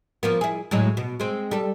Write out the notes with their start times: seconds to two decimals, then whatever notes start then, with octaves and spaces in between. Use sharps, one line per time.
0.23 F3 A#3 B3
0.41 E4 G#4
0.71 A2 F#3 G#3
0.97 B2
1.20 G#3 C4
1.51 G3 A4